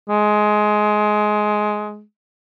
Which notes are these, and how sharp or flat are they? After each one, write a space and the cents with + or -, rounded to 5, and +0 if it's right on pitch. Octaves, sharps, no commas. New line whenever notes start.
G#3 +15